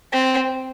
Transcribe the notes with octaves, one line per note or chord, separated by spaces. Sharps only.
C4